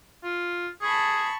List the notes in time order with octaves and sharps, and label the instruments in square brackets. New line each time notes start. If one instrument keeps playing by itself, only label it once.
[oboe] F4
[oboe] G#4 [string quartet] A5 B5 C#6